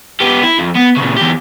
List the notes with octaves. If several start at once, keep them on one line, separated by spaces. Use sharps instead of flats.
B3 G4
E4
F2
B3
A#2 C#3
E2 G4